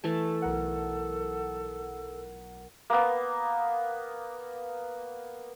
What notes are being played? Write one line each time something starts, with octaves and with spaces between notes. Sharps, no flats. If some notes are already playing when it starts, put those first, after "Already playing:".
E3 A3 A4 A5
B1 A#4 F#5
A#3 B3